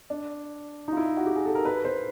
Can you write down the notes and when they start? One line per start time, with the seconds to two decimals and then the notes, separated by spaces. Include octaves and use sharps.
0.10 D4
0.88 D#4 F4
0.97 E4
1.17 F#4
1.26 G4
1.36 G#4
1.45 A4
1.55 A#4
1.65 B4
1.85 C5